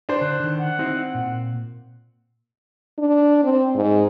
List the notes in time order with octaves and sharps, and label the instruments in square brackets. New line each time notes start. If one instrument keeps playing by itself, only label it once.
[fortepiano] D4 C5
[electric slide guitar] D3 [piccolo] F#6
[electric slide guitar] D3 D#3
[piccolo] F#5
[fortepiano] C4 [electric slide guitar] D#4 E4
[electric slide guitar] A#2
[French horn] D4
C4
G#2